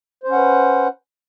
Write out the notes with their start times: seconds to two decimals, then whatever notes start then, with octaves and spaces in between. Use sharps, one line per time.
0.24 C5
0.28 C#4
0.32 F#5
0.37 B4